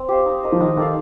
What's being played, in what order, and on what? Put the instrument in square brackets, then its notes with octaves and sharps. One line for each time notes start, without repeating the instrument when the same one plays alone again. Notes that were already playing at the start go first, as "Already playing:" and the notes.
Already playing: [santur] C4
G4 C5 F5
D#4
A#4 D#5
[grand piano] F3
[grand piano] D#3 [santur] D#4
[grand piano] D#3 [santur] A4 D5 F5